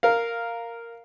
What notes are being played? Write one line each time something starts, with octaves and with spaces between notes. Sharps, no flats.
A#4 F5